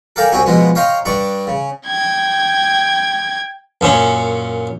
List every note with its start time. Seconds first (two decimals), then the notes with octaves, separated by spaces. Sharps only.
0.16 A4 A#4 D5 F5 G5 G#5
0.32 C2 C4 C#4 F#4 G#5
0.46 B2 F3 G#3 B3
0.75 C#5 D#5 F5 G5 A#5 C6
1.05 G2 D4 D5 C#6
1.47 C#3
1.87 G5 G#6
3.81 F#2 A#2 C#4